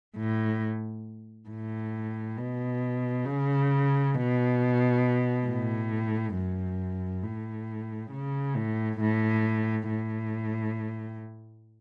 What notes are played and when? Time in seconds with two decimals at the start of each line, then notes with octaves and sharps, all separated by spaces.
0.17 A2
1.49 A2
2.37 B2
3.25 C#3
4.14 B2
5.47 A2
6.35 F#2
7.23 A2
8.12 C#3
8.56 A2
9.00 A2
9.89 A2